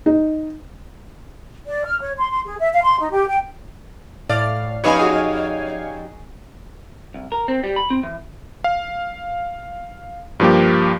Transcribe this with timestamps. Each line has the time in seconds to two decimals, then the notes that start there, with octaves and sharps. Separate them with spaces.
0.06 D#4
1.66 D5
1.84 F6
2.01 C#5
2.17 C6
2.30 C6
2.45 G#4
2.60 E5
2.73 F5
2.84 C6
2.99 D#4
3.11 G4
3.28 G5
4.29 A2 D5 F5
4.84 F2 D#4 G4 B4 C#5 F5 G#5 B5
4.99 F#4 G#4
7.14 C2
7.32 A#4
7.48 C4
7.64 G3
7.76 B5
7.90 C4
8.03 E3
8.64 F5
10.40 G2 F3 A#3 G4